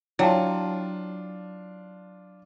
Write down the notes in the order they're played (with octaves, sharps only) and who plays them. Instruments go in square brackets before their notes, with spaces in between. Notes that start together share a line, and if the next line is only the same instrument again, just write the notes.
[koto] F#3 [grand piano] D4 F4 [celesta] E4 G5 A5